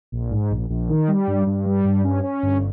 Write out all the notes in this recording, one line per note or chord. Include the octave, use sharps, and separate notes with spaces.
A#1
G#2
A#1
A#1
D#3
G3
G2
G2
G3
G2
C#4
C#4
G1